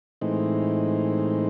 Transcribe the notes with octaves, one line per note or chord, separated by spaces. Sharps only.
A2 E3 G#3 C4 D#4